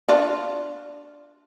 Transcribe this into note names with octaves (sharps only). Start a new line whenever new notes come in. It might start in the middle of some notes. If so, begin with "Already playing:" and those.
D4 F4